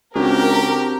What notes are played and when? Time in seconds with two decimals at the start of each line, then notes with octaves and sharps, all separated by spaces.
0.15 C#2 C4 D4 F#4 G4 A#4